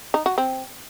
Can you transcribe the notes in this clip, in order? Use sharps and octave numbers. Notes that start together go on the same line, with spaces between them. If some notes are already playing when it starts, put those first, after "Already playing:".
D#4
F#4
C4